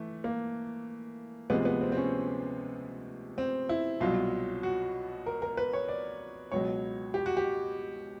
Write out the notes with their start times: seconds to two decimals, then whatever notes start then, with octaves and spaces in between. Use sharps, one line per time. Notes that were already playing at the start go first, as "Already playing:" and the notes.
Already playing: E3 A3
0.24 A#3
1.50 D2 C3 F3 G#3 B3
1.65 B3
1.81 C4
1.92 C4
1.97 C#4
3.38 C4
3.69 E4
4.00 C2 B2 F#3 F4
4.63 F#4
5.26 A#4
5.42 A#4
5.57 B4
5.73 C#5
5.88 D5
6.52 C#2 B2 F#3 C#5
7.14 G4
7.26 F#4
7.37 G4